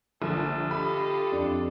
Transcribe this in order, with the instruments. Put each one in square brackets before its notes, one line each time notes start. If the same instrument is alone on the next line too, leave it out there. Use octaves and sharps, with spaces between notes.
[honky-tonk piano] A#1 [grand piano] D3 [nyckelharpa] A4
[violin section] F4 A4 [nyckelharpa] G4 D#5 [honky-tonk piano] B5
[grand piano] F2 D4